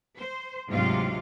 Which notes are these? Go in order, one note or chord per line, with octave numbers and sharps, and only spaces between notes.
C5
D2 G#2 C3 F#3 F4 F5